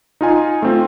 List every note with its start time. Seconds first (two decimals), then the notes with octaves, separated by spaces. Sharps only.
0.21 D#4 F4 G#5
0.62 A3 C4 F4